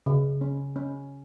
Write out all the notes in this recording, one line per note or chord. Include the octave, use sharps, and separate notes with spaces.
C#3
C#4
C#4